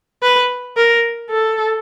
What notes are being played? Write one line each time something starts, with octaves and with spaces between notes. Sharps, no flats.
B4
A#4
A4